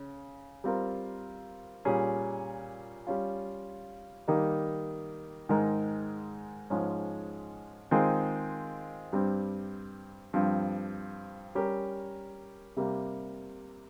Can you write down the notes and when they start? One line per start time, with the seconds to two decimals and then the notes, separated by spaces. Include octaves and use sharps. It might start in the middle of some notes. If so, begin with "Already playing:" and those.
Already playing: C#3
0.64 G3 C4 F4 A#4
1.85 A#2 G3 C#4 G#4
3.07 G3 C#4 F4
4.28 D#3 G3 A#3 D#4
5.49 G#2 D#3 G#3 D#4 A#4
6.70 G#2 F3 G#3 C#4
7.91 D#3 G#3 C4 F4 G#4
9.13 G2 G3 C4
10.34 G2 F3 C4 F4
11.55 G3 C#4 G4 A#4
12.77 C3 G3 A#3